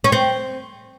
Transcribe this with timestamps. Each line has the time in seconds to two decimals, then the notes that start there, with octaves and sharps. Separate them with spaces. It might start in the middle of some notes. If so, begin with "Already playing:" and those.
0.04 C#4
0.12 C4